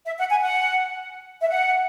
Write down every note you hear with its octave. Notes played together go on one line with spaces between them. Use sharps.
E5
F#5
G#5
F#5
E5
F#5